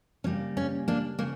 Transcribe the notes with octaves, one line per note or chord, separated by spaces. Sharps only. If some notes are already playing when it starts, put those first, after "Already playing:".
C#3 G3 A#3 C#4
C#4
A#3 D4
C#3 A#3